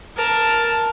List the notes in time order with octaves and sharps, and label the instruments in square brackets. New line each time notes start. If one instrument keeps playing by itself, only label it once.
[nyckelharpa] A#4 A5